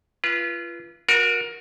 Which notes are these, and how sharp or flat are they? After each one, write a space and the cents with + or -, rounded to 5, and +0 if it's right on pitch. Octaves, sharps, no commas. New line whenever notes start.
F4 -30 B4 -20
F#4 -25 A#4 +15